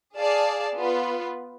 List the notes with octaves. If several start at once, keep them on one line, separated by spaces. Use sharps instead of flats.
G#4 D5 F5 A5
B3 F4 B4